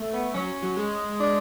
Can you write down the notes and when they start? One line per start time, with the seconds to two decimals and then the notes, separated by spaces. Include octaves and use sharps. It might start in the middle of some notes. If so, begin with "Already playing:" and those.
Already playing: A3
0.13 B3
0.34 F#3 C#4
0.62 F#3
0.77 G#3
1.20 D4